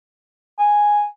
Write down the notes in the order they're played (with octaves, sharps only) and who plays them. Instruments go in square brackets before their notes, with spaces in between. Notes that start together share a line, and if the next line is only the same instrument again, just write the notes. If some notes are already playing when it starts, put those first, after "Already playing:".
[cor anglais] G#5